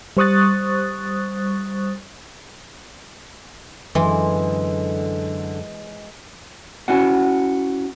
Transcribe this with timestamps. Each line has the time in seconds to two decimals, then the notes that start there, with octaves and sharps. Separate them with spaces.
0.17 G3 C5 C#6 D#6 F#6 A6
3.95 F#2 D3 E3 G#3
6.88 C#4 E4 F#4 F#5